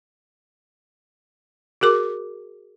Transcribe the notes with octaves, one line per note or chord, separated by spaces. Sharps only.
F#4 G#4 A#4 D6